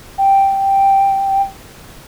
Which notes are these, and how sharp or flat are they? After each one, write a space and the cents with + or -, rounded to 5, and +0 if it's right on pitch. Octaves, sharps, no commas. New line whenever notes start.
G5 +0